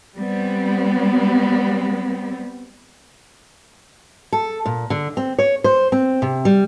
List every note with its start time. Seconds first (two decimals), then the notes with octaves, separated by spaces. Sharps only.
0.18 G3 B3 C4
4.32 A4
4.66 A#2
4.90 D3
5.17 C4
5.39 C#5
5.64 C5
5.92 C4
6.22 C3
6.45 G3